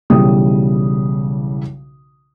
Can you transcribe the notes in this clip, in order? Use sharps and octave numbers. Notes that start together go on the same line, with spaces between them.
B1 C#3 E3 G3 D#6